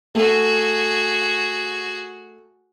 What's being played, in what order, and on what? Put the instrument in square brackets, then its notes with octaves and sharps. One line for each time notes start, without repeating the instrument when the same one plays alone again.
[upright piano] A3 [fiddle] F#4 G#4